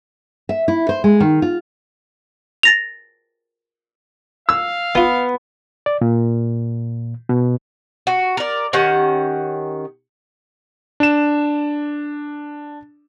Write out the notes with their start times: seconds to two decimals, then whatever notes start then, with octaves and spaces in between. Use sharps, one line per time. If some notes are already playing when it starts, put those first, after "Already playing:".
0.49 E5
0.68 E4
0.89 C5
1.04 G#3
1.20 D#3
1.42 F4
2.63 A6 A#6 F7
4.49 F5 E6
4.95 B3 D#4 F4
5.86 D5
6.01 A#2
7.29 B2
8.07 F#4
8.37 A#4 D5
8.73 D#3 C#4 G4 F#5
11.00 D4 E7